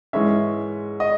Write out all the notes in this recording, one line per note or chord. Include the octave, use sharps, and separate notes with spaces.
G#2 E3 G#3 C#4 E5
D#5